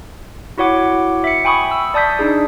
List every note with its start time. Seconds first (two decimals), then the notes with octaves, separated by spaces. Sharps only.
0.58 E4 F#4 C#5 F#5 D6
1.24 E5 C#7
1.45 G5 G#5 B5 C#6 D#6
1.71 E6
1.94 D5 A5 D#6 G6 B6
2.19 D4 D#4 G#4